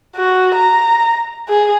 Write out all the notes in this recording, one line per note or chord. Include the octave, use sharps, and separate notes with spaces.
F#4
A#5
G#4